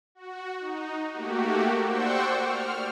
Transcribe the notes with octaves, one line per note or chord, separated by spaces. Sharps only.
F#4
D#4
A3 A#3 F#4 G4
C5 D5 F#5 G5 C#6 E6
F6